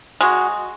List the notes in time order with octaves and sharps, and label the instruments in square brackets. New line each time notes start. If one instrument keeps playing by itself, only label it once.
[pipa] G#3 [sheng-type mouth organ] F#4